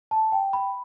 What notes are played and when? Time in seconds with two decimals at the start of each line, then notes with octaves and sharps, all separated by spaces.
0.11 A5
0.32 G5
0.53 B5